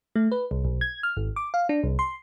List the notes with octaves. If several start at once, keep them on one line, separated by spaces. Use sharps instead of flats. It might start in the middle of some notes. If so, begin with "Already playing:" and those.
A3
B4
C2
B1
G#6
F6
G#1
D6
F5
D4
C2
C6